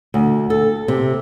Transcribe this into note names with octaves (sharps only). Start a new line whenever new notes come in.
D2
A4
C3